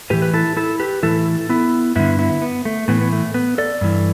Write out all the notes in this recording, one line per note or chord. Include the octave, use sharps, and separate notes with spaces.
A2 E3 G4 B4
B4
E4 A4
E4 A4
G4 B4
A2 E3 E4 A4
B3 E4
G2 D3 B3 E4
B3 E4
B3
A3
A2 E3 B3
B3
A3
B3
A4 D5
G2 E3